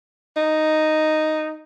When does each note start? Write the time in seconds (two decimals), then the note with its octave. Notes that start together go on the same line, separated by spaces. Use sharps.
0.37 D#4